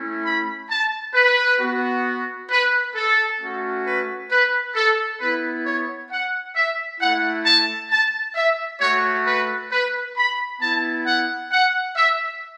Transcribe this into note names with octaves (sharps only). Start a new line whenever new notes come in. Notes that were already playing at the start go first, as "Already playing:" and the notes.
Already playing: A3 C#4 E4
B5
A5
B4
B3 F#4
B4
A4
A3 C#4 F#4
B4
B4
A4
B3 E4 B4
C#5
F#5
E5
A3 E4 F#5
A5
A5
E5
A3 F#4 C#5
B4
B4
B5
B3 E4 A5
F#5
F#5
E5